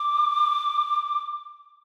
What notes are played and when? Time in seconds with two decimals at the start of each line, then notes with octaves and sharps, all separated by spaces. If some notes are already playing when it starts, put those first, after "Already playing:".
Already playing: D6